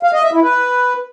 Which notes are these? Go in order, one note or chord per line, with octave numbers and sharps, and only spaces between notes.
F5
D#5
E5
E4
B4